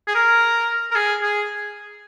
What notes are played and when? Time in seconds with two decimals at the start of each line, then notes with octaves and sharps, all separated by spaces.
0.08 G#4
0.15 A#4
0.91 A#4
0.95 G#4
1.23 G#4